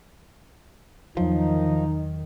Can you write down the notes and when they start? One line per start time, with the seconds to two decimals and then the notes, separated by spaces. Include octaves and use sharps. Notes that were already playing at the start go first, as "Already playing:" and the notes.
1.17 E2 D#3 F3 F#3 D#4